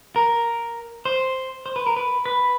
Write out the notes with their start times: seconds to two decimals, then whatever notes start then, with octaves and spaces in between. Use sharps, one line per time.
0.16 A#4
1.05 C5
1.66 C5
1.76 B4
1.87 A#4
1.96 B4
2.26 B4